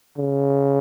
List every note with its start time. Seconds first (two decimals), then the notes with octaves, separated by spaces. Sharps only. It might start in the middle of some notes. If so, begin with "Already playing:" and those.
0.18 C#3